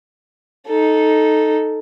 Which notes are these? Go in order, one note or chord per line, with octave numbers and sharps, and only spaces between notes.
D#4 A4